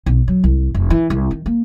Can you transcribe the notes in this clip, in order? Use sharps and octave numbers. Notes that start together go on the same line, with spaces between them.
B1
F#3
C2
F1
E3
C2
D#3
A#3